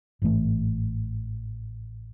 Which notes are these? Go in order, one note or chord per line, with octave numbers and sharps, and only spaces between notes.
A1 G#2 E3 A3